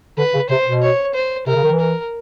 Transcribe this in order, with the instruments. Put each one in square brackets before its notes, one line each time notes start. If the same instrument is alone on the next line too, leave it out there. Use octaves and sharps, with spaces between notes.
[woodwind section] D3 [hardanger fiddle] B4
[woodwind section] C#3
[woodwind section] C3 [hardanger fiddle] C5
[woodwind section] B2
[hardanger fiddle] C#5
C5
[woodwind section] C3 [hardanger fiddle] A#4
[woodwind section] C#3
D#3
E3
[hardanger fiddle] A#4